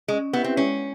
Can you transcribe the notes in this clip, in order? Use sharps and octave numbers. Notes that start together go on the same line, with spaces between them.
G#3 C#4
B3 E4 G4 B4 E5
C4
G#3 C#4